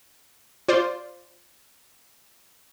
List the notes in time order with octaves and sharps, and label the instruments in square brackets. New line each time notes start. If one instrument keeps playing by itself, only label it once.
[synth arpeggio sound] F4 C5 D5 C6